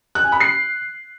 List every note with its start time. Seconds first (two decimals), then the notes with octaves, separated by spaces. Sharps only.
0.15 F#6
0.24 G#5
0.32 B5
0.40 C7